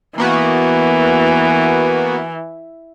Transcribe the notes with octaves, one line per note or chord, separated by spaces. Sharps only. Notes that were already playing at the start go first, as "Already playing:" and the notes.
E3 A#3 B3 F#4